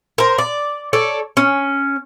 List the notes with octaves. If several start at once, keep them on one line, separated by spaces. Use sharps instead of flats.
A#4 C5
D5
A4 C#5 D5
C#4